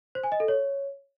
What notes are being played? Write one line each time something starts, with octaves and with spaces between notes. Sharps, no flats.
C5
G#5
D#5
A4
C#5